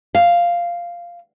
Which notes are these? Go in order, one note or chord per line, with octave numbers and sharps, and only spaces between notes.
F5